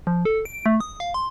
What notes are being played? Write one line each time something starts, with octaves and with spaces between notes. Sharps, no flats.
F3
A4
D7
A3
D#6
F5
C6